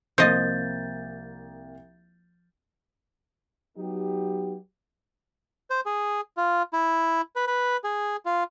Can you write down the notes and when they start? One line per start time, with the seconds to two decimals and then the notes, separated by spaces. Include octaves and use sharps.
0.18 C2 F3 A#3 D#5 G6 A6
3.78 F#3 B3 D#4 G4
5.70 C5
5.86 G#4
6.37 F4
6.73 E4
7.36 B4
7.47 B4
7.84 G#4
8.26 F4